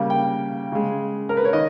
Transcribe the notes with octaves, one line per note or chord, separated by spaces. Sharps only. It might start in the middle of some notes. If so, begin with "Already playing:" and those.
Already playing: C#3 G3 A#3
G5
C#3 G#3
A#4
B4
C#5
D#3 D#5